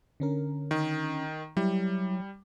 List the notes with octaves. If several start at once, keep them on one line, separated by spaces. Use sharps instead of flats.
D3 C#4 A#4
D#3
F#3 G3 E4